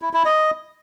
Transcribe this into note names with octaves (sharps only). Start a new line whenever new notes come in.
E4
E4
D#5